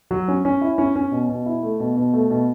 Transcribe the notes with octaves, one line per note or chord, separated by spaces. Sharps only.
F#3
C#4
C#4
E4
C#4
C#4
B2
B2
E4
A3
B2
B2
A3
B2